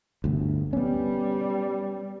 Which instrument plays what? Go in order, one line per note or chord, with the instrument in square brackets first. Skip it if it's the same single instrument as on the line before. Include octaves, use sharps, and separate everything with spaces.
[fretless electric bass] G1 D2
[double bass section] G3 [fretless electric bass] B3 C#4